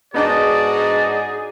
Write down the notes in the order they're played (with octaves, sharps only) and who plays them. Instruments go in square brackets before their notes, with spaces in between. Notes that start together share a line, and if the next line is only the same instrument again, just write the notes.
[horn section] G#2 D#4 F#4 [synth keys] B3 D4 D#5 [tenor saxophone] G#4 [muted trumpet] D5